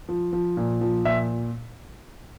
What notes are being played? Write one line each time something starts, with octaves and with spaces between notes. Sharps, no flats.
F3
F3
A#2
F3
A#2 E5